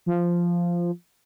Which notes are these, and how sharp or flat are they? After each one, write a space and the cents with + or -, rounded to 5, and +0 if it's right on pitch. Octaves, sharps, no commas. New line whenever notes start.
F3 -10